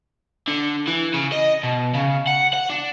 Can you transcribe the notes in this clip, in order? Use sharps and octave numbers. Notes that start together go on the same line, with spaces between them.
D3
E3
C#3
D#5
B2
C#3
F#5
F#5
D4